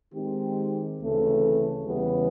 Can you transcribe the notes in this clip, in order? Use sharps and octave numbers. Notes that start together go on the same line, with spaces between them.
D#3 G#3 C4 D#4 G4
D2 C#3 E3 A3 C4
E2 C#3 E3 G3 B3